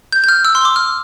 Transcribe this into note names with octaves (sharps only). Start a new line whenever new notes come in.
G6
G6
F6
E6
C6
D6
F6